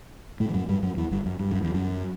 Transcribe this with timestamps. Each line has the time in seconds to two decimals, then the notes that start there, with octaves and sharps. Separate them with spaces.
0.40 A2 A3
0.49 E3
0.54 F#2 F#3
0.69 G2 G3
0.83 F#2 F#3
0.97 E2 E3
1.11 G1 G2
1.26 F#2
1.40 G2
1.51 F#2
1.63 E2
1.74 F#2